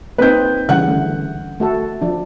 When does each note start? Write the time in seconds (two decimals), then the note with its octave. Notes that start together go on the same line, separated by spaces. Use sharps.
0.18 A#3 C4 D#4 B4 G6
0.69 C#3 E3 G3 F#5 F#6
0.88 D3 E3 A3
1.60 A3 F#4 A4
2.01 F3 D4